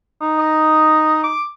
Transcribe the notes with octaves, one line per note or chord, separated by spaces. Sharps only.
D#4
D#5
D6